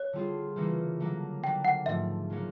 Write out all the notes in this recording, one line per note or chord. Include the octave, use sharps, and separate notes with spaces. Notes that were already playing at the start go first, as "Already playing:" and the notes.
Already playing: A#3 C#5
D3 G3 C4 F4 G#4
C#3 E3 G3 A#3 C#4
D3 F#3 A#3
F#3 A#3 D4 G5
F#5
G#2 F3 A3 E5
C#3 F#3 A#3 C#4